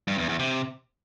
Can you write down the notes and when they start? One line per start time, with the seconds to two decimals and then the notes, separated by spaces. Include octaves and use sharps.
0.07 G2
0.18 E2
0.29 E2
0.39 C3